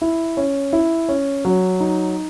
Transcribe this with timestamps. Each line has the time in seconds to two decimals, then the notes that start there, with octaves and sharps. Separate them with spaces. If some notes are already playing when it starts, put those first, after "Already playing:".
0.02 E4
0.37 C#4
0.73 E4
1.09 C#4
1.45 F#3
1.80 D#4